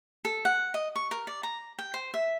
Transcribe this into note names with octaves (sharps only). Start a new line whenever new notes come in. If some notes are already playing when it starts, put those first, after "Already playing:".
A4
F#5
D#5
C#6
A#4
D5
A#5
G5
C5
E5